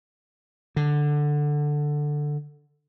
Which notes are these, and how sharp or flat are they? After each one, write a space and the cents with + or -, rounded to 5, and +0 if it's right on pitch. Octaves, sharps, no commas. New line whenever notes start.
D3 +5